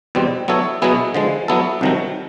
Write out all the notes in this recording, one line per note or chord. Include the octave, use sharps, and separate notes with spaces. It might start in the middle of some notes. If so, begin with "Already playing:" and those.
E2 B2 G3 C4
F#3 B3 E4 A4 C#5
B2 F#3 B3 E4 G#4
D3 F3 G#3
F#3 B3 E4 A4
C2 C3 D#3 F#3